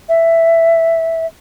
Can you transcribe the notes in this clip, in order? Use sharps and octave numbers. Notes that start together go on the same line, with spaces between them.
E5